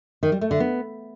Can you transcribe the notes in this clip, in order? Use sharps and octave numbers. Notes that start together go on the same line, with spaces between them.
D#3
G3
A3
D3
B3